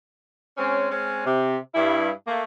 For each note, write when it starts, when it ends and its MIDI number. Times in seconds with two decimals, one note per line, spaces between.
0.57 0.87 56
0.57 0.87 60
0.57 0.87 61
0.91 1.24 56
0.91 1.24 60
0.91 1.24 61
1.25 1.56 48
1.75 2.09 43
1.75 2.09 64
2.27 2.43 57
2.27 2.43 58